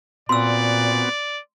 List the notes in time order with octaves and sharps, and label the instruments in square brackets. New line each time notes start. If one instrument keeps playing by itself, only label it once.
[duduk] A#2 [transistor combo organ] B3 C4 F#4 [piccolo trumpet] D5 [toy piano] C6 E6